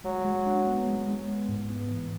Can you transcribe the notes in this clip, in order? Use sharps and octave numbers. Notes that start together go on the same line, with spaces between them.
F#3 G#3
G#3
D4
B3
G#3
G#3
B3
G#2
B3
E3